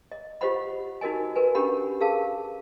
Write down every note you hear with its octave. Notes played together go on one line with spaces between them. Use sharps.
D#5
F4 G4 C5 D#5 F#5 B5
D#4 F#4 A#4 D#5 G#5
A#4 B4 G#5
C#4 D4 G4 A#4 F#5 B5
G#4 A#4 F5 A5